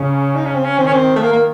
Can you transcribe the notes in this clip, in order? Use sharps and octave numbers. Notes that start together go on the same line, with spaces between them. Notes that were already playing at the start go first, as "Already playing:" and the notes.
Already playing: C#3 C#4
D#4
C#4
C4
C#4
D#3 C4
C#4
C4
A3
A#3
A#3